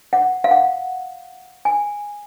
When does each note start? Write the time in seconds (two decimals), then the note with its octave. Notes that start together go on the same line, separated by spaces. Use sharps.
0.13 F#5
0.44 F5
0.51 F#5
1.65 G#5